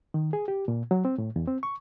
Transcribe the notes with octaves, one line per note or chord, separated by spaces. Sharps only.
D#3
G#4
G4
A#2
F#3
C4
A2
E2
C4
C#6